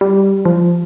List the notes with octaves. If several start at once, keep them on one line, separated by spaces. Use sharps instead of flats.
G3
F3